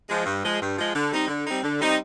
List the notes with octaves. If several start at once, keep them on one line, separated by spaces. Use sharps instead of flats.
F3 G#3
G2
F3 G#3
G2
F3 G#3
D3
G3 C4 D#4
D3
G3 C4 D#4
D3
G3 C4 D#4